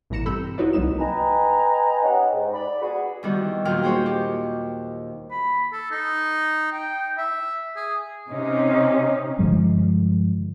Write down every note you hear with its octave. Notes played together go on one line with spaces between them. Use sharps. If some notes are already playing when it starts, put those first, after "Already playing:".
A1 B2 E3 A#5 C#7 E7
G2 C4 A4 B5 E6 G6
D#4 E4 F#4 B4 C#5 D5
C2 F#3 A#3 D#4 E7
B4 D#5 G5 G#5 A#5
C#4 D#4 G4 F#5
G#2
D5 B5
B3 F#4 G#4
E2 D#3 G3 F#4
D#2 A#2 D#3 F#3 G5 F6
A#3 F#4 G#4 C5 C#5
G4
B5
A4
D#4
G5
E5
G#4
C3 C#4 D#4
G2 D3 F3 G#3